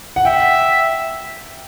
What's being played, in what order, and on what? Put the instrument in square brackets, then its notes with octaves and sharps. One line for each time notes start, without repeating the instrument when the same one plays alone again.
[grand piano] F#5
[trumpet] E5 [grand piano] G5